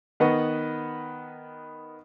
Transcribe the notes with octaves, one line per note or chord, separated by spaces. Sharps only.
D#3 B3 B4 D#5 F#5 C#6